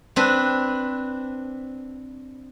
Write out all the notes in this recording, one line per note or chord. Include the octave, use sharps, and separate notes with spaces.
C4 D4 B4